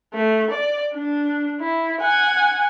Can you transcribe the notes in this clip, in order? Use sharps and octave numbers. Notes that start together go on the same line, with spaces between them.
A3
D5
D4
E4
F#5 G#5